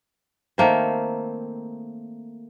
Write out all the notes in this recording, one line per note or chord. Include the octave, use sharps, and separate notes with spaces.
D#3 A3 A#3 C4